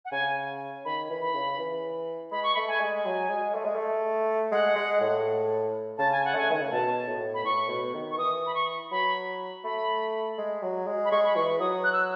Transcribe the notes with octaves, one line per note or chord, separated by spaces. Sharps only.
F#5
C#3 G#5
D#3 B5
E3
B5
C#3
E3
G#3 B5
C#6
A3 B5
G#5
G#3
F#3 G#5
G#3
A3
G#3
A3
G#3 F#5
G#3
A2
C#3 A5
G#5
F#5
A3 G#5
D#3
C#3
B2 A5
A2
B5
A2 C#6
B2
D#3
C#6
E3 D#6
B5
C#6
F#3 B5
A3 B5
G#3
F#3
G#3
B5
G#3 C#6
B5
E3 C#6
F#3 D#6
F#6
E6